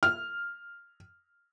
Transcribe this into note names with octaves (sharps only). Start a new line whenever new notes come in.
F6